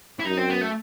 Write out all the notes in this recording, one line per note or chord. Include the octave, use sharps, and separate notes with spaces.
E4
F#2 D#4
C4
B3
A3